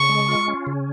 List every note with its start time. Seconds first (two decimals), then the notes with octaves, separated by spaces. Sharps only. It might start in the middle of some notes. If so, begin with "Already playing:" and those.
Already playing: C#3 C#6
0.09 G#3
0.28 F4
0.48 C#4
0.67 C#3